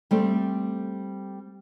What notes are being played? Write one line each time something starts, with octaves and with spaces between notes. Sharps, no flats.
G3 A3 C4